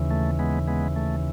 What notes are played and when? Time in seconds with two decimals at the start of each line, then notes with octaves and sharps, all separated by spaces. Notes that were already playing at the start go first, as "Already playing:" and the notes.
Already playing: D#2 C#3 E3
0.11 A3
0.39 G#3 B3
0.68 G#3 B3
0.96 A3